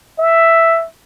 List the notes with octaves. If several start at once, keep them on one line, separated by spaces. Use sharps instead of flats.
E5